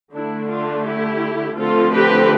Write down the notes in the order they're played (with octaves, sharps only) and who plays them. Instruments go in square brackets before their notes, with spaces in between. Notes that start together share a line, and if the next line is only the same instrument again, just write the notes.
[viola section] D3 A3 D4 E4
D4 F4
E4 G4
D3 F3 A3 C4 F4 A4
G4 B4